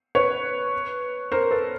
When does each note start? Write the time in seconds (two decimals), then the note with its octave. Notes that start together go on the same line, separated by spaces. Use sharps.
0.15 B4 C#5
1.32 A#4 C5
1.51 A4 B4